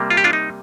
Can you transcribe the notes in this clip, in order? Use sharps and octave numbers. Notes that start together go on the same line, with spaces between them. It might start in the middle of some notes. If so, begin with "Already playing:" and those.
Already playing: C3 G3 A#3
F4
G4
D4 F4
D#4